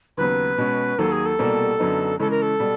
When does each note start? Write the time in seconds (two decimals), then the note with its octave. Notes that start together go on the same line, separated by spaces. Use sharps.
0.17 D#2 C#3 F#3 B3 B4
0.58 B2 G#3 C#4
0.99 D#2 D#3 F#3 A#3 A4
1.12 G#4
1.25 A4
1.39 C2 B2 G3 A#3
1.79 F#2 D3 F#3 B3 D#4
2.19 C#3 E3 G#3 C#4 A4
2.30 A#4
2.42 A4
2.60 B2 G3